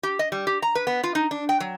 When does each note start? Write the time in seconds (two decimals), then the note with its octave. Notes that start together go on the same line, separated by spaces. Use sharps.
0.03 G4
0.19 D#5
0.32 G3
0.47 G4
0.62 A#5
0.75 B4
0.87 B3
1.03 F4
1.15 D#4
1.31 D4
1.49 G5
1.60 F#3